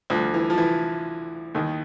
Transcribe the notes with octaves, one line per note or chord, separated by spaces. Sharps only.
D2 D3 F3
E3
F3
E3
D#2 D#3